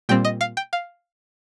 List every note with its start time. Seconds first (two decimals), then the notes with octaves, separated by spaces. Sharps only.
0.09 A#2 G3 C4 G5
0.25 D#5
0.41 F5
0.57 G5
0.73 F5